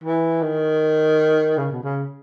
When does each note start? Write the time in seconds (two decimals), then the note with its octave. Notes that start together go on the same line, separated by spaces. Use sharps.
0.04 E3
0.42 D#3
1.58 C#3
1.72 B2
1.83 C#3